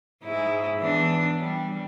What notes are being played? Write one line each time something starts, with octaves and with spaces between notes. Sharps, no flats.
G#2 G#3 E4
E3 B3 D4
G3